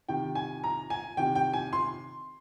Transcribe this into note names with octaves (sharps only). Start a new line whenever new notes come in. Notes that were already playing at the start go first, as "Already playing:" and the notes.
C3 D#3 G5
G#5
A#5
G#5
C3 D#3 G5
G5
G#5
C6